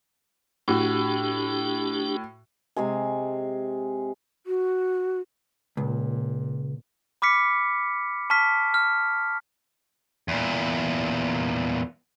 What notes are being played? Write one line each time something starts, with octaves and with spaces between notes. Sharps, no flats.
A2 D4 F#4 G4
C3 G#3 G#5
F#4
C#2 A#2
B5 D6 F6 B6 C#7
A5 C#6 F6 B6
F6
E2 A#2